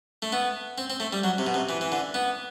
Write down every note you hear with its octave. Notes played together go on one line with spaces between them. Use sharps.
A3
B3
C4
C4
A3
G3
F#3
C3
B2
C3
E3
E3
D3
B3